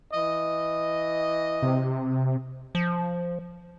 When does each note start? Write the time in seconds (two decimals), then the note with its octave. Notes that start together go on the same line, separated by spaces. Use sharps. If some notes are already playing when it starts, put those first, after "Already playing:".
0.13 E3 D#5
1.62 C3
2.75 F3